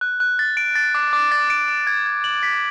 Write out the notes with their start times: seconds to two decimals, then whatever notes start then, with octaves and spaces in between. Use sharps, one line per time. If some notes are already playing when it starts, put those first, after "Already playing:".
0.01 F#6
0.20 F#6
0.39 A6
0.57 D7
0.75 A6
0.95 D6
1.13 D6
1.32 A6
1.50 D7
1.68 D7
1.87 G#6
2.06 G#6
2.24 F#7
2.43 B6